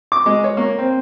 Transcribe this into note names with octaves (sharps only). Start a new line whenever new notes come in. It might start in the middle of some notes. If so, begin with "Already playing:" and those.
D6
G#3
C#5
A#3
C4